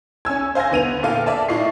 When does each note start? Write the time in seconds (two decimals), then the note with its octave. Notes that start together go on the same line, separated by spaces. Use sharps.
0.25 C#4 G#5 E6 G#6
0.55 C5 F5 G#5 G#6 A#6
0.71 D3 B3 D#7 F7
1.03 A#2 A4 F5 G5 D#7
1.26 D5 E5 A5
1.48 A2 F4 D#5 C#6 C7